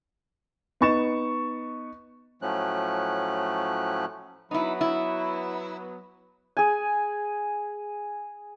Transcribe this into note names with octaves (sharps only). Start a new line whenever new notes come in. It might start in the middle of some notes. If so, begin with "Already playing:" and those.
B3 D#4 C#6 A6 E7
A2 F3 F#3 A3 C#4 F#6
F#3 B3 D#4 E4
E4
G#4 G#5